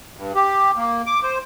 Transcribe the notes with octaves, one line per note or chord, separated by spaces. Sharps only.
G2
G4
A#3
D6
C5